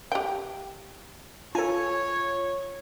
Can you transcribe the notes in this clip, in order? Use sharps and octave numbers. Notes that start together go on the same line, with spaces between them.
G4 G5
F4 A4 C#5 G#5